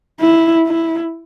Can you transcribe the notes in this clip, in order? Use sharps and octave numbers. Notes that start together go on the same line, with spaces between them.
E4
E4